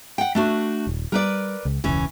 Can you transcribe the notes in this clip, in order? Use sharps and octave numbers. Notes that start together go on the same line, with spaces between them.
F#5 G5
A3 D4 F#4
D#1
G3 A#4 B4 D5
C#2
E1 C#2 E3 C#4